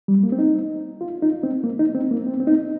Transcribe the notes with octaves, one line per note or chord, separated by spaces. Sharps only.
G3
A#3
C4
D#4
F4
D#4
C4
A#3
D#4
C4
A#3
C4
C4
D#4